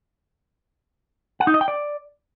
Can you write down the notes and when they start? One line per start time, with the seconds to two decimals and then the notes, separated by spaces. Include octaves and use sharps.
1.40 F#5
1.47 D#4
1.54 D#5
1.61 G5
1.68 D5